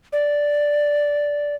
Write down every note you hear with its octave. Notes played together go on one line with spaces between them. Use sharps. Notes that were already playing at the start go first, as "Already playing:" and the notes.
D5